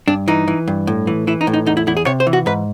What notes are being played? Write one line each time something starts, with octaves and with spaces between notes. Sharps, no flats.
G2 D4
E3 D#4
E3
G2
A2
E3
E3 E4
D#4
A2
D#4
E2 D#4
E4
E2 E4
G#4
C3 C#5
C5
E3
F#4
G#2 B4